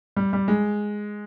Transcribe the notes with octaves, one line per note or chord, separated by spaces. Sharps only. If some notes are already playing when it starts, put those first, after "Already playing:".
G3
G3
G#3